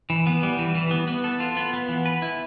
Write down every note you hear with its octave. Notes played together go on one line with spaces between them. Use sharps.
E3
B3
G3
E3
E3
B3
B3
A4
F4
B3
B3
E3
B4
E4